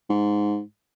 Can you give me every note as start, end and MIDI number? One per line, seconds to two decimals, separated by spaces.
0.09 0.61 44